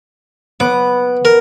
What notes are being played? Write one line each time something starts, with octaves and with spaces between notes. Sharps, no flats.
B3 D6
A#4